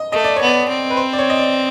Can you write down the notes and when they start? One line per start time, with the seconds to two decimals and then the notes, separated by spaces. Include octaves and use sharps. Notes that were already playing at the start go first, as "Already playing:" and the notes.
Already playing: D#5
0.12 A3 D#5
0.24 D5
0.36 B3 C#5
0.47 D5
0.69 C4
0.90 B4
0.97 C5
1.13 D5
1.19 C#5
1.30 D#5
1.39 D5